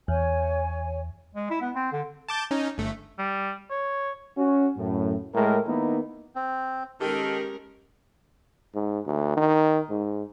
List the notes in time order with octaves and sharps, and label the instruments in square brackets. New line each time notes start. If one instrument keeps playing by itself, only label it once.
[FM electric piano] E2 [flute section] C#5 G#5
[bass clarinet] G#3
E4
B3
C4
D3
[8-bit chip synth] A5 D6 G6
C#4 D#4
G1 A3
[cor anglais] G3
C#5
[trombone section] C#4 F#4
F#2 A2
A2 G#3 A#4
D#3 A#3 B3 D#4 E4
[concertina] C4
[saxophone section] D#3 [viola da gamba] G#3 C#4 A#4 [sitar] G4 [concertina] A4
[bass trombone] G#2
D2
D#3
G#2